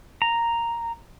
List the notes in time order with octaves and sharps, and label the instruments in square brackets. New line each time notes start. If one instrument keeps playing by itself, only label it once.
[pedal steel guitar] A#5